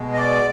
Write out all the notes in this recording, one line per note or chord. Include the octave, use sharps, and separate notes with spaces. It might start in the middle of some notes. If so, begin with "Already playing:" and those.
Already playing: B2 G#3
D#5
D5